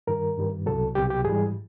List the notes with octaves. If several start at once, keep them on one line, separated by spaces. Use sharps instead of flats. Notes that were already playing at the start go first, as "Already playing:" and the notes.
G2 D#3 G3 A#4
G2 D#3 G3
C2 B2 F#3 A4
C2 B2 F#3 G4
G4
G#2 E3 G3 G#4